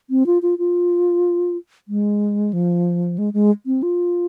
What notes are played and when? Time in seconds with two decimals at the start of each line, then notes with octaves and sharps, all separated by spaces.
0.10 C4
0.26 F4
0.42 F4
0.59 F4
1.88 G#3
2.53 F3
3.18 G#3
3.34 G#3
3.66 C4
3.83 F4